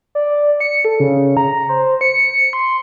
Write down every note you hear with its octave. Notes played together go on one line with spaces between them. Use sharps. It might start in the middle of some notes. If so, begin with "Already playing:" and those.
D5
C#7
A4
C#3
A#5
C5
C#7
C6